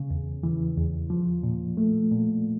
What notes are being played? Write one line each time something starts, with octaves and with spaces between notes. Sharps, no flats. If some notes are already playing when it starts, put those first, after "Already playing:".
Already playing: C#3
E2
E3
E2
F3
A#2
A3
A#2